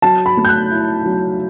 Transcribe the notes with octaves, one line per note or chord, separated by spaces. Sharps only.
F#3 A5
B5
A3
G6
F#6
E4
F#3